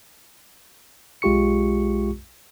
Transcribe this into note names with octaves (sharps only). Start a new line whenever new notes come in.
B1 G#3 F4 G4 C#6 C#7